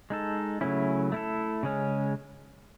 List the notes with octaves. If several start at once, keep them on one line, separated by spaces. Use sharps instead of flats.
G#3 D#4 A4
C#3 F#3 A3 C#4 E4
A3 E4 A4
C#3 G#3 C#4